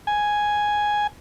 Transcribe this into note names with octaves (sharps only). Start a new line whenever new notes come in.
G#5